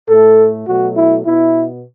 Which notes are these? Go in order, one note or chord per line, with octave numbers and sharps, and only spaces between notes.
A2 A3 A4
B2 F#3 A3 F#4
E4
B2 B3 E4